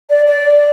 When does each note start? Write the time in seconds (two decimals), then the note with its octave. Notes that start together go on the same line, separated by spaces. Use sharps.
0.09 D5
0.26 D5